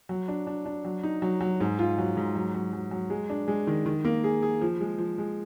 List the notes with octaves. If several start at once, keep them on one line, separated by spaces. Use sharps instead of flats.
F#3
D4
D4
D4
F#3
D#4
F#3
F#3
G#2
F4
F#3
G#2
F#3
F#3
F#3
F#3
G#3
D4
G#3
D#3
D#3
A#3
G#4
G#4
F3
G#3
F3
G#3